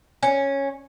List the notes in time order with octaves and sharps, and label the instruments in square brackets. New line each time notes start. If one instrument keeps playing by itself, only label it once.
[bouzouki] C#4